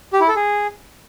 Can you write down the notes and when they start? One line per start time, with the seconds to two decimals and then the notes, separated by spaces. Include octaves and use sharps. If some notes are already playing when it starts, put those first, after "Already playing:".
0.13 G4
0.21 E4
0.28 A4
0.36 G#4